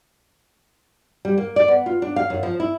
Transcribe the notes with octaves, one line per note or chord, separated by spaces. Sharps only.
G3
A#3
D5
B3
F4
D4
F5
F#2
F3
E4